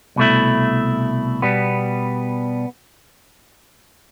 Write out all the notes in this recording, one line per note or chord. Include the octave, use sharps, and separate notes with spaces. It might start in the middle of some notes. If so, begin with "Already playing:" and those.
C2 B2 A3 E4
B2 G3 B3